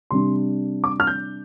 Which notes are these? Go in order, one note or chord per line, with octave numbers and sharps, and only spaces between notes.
C3 G3 D4 C6
D6
F6
G6